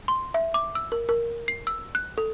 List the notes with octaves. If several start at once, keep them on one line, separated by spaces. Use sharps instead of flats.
C6
E5
D6
E6
A#4
A#4
C7
E6
F#6
A4